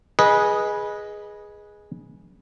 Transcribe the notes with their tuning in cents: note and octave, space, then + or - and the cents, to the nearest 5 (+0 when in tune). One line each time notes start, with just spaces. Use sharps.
G#4 +0 B4 -20 D#5 +0